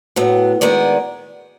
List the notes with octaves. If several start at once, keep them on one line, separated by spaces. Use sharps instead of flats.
A2 F#3 B3
D#3 G#3 B3 D5